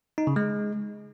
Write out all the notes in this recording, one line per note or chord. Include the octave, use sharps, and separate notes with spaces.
D#4
C#3
G#3